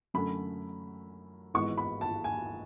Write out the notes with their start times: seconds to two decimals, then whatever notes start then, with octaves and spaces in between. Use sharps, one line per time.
0.14 F#2 D3 A3 C#4 B5
1.54 G#1 G#2 E3 G#3 B3 C#6
1.78 B5
2.01 A5
2.24 G#5